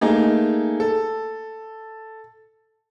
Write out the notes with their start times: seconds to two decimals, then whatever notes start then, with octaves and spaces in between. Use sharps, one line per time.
0.01 A3 A#3 D#4 G#4
0.80 A4